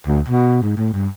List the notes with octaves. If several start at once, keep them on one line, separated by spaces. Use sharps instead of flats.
D2
B2
G#2
A2
G2